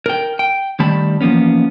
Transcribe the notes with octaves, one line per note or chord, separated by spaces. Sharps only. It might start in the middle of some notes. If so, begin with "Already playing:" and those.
A#4 G5
G5
D#3 G3 A3 A5 B5
E3 F3 A#3 B3 C#4